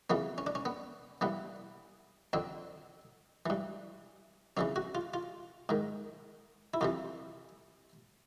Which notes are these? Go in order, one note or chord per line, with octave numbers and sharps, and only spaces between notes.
F2 C#3 E3 B3
C#4
D4
C#4
B3
G2 E3 B3
F2 D3 C4
G2 E3
F2 C#3 E3 C#4
F#4
F4
F4
G#2 D#3
E4
F2 C3 E3 F4